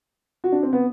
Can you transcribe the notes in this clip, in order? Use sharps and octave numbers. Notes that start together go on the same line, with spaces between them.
F#4
D4
C4
B3